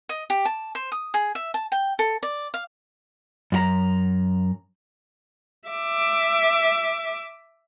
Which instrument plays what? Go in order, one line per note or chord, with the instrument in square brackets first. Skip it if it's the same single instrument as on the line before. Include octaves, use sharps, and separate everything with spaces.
[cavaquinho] D#5
G4
A5
C5
D#6
G#4
E5
A5
G5
A4
D5
F5
[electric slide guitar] F#2 F#4 A#5
[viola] E5 D6